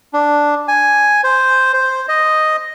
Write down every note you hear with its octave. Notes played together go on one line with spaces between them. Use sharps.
D4
G#5
C5
C5
D#5